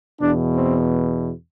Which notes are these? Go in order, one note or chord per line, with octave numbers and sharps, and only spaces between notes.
E2 B2 D4
C4